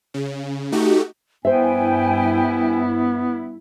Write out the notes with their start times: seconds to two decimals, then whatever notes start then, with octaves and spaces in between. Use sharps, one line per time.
0.14 C#3
0.72 A3 D#4 F#4 G4
1.45 G2 B3 E4 C5 E5 G5 G#5